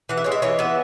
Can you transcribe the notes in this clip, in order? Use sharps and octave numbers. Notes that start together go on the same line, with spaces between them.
E3 F#5
E5
G#3 C#5
E5
E3 C#5
B3 E5